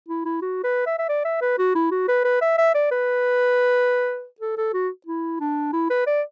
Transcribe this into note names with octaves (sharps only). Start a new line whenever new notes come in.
E4
E4
F#4
B4
E5
E5
D5
E5
B4
F#4
E4
F#4
B4
B4
E5
E5
D5
B4
A4
A4
F#4
E4
D4
E4
B4
D5